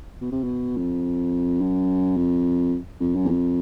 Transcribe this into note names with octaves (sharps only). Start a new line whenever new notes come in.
B2
C3
B2
F2
F#2
F2
F2
F#2
E2
F2